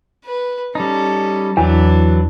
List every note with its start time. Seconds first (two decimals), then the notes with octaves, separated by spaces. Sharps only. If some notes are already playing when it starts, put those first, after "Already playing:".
0.25 B4
0.75 G3 C#4 D#4 A4
1.57 E2 E3 F#3 D4